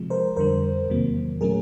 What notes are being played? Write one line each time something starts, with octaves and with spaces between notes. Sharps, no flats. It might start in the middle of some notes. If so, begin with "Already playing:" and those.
Already playing: C3 F3 G#3
A#4 C5
F2 D3 G3 A#4 C5
E2 C3 D#3 F#3 A#3
A#2 F#3 A3 C#4 G#4 A#4